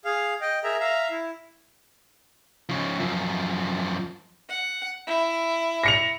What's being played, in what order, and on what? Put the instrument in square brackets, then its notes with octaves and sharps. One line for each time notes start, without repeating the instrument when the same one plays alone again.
[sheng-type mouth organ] G#4 F5
D#5 G5
G#4 A#4 E5 A#5
E5 F5 A#5
E4
[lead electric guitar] C#3 F3
F#2 F3
[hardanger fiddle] F#5
E4
[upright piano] A#6 C#7 F7